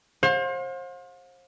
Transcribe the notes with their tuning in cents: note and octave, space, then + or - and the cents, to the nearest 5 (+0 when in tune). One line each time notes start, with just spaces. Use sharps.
C5 +35 F5 +40